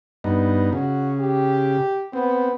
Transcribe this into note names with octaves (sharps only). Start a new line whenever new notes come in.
G2 B3 D#4
C#3 F#4
G4
B3 C4